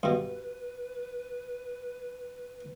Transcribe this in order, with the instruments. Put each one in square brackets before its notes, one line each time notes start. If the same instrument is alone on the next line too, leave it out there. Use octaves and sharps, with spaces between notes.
[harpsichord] G2 B2 [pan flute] B4